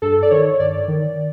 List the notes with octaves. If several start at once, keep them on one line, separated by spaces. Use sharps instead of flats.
G2 A4
D5
D#3 C#5
G2 D5
D#3